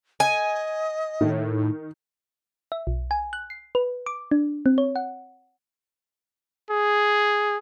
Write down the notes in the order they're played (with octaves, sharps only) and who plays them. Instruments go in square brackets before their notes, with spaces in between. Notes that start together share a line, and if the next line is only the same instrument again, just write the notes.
[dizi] D#5 [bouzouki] G#5
[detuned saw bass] A2 [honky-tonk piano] D#3
[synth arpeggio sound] E5
B1
G#5
F#6
C7
B4
D6
D4
C4
C#5
F#5
[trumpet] G#4